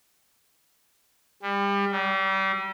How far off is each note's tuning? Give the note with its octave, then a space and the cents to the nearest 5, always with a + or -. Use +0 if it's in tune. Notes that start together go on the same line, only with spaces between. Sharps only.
G3 +30
G3 -30